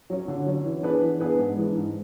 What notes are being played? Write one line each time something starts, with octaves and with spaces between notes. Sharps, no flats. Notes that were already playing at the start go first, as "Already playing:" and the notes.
F#3 C#4
D3
F#3 C#4
E3
B3 D4 G#4 B4
E3
B3 D4 G#4 B4
G#2
E3 G#3 D4
G#2